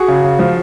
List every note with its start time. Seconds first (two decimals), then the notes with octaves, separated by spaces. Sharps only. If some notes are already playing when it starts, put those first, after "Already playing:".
Already playing: F#4 G#4
0.08 C#3
0.24 C#3
0.39 F3